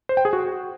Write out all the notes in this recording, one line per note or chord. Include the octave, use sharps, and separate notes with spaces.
C5
G5
G#4
F#4